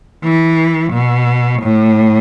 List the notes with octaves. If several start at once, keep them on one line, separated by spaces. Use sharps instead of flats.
E3
B2
A2